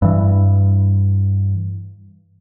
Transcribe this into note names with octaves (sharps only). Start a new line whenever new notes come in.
G2 E3